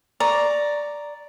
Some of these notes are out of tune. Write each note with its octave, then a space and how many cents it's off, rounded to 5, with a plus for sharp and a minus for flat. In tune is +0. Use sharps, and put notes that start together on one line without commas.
D5 +0 A#5 +0 C#6 +5